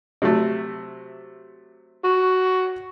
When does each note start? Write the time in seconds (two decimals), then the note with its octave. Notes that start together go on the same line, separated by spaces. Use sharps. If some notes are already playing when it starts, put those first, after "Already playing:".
0.22 C3 F#3 A3
2.04 F#4